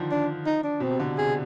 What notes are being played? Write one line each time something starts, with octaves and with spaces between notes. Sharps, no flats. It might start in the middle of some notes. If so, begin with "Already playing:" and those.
Already playing: D3 D#3 F3
D4
D#4
D4
B2 C4
C3
D3
C3 G#4